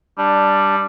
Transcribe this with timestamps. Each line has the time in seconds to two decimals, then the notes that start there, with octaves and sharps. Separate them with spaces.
0.18 G3 D4